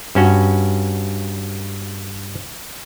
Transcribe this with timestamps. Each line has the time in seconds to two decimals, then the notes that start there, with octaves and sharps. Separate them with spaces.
0.15 G2 C#4 F#4